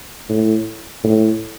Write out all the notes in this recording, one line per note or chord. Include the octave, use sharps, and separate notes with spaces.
A2
A2